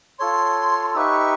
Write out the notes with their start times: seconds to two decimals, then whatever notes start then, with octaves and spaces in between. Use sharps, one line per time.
0.19 F4 A4 C#5 C6
0.94 D#4 G4 B4 E5 C#6 E6